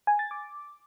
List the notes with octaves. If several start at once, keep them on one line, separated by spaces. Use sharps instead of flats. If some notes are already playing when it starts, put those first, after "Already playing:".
G#5
A6
D6